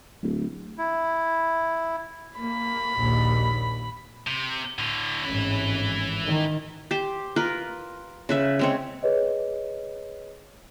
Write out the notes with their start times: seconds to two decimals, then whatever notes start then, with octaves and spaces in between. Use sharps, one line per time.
0.23 D1
0.78 E4
2.39 A#3 B5
2.97 A#1 D#2
4.27 C3
4.79 A2 D3
5.24 G#1 A2 E3 C#4 B5
6.25 D#3
6.91 G4 C5
7.36 F4 A#4 B4
8.29 C#3 B4 E5
8.59 G#3 C4 C#5
9.03 G#4 B4 C#5 D#5